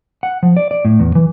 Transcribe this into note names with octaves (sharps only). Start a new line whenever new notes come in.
F#5
F3
D5
D5
A2
E2
E3